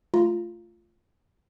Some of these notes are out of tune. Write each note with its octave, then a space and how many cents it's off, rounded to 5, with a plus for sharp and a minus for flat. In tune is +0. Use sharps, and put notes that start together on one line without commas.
A3 -5 F4 -10 A#5 +0